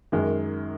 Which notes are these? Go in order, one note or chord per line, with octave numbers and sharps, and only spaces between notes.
F#2 D#3 G#3